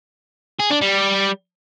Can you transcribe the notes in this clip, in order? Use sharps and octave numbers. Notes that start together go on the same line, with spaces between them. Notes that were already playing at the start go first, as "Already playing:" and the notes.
G#4
D4
G3